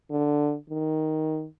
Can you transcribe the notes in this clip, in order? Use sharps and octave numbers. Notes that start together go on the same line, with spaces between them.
D3
D#3